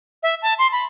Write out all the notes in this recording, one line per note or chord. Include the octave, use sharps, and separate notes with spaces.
E5
A5
C6
B5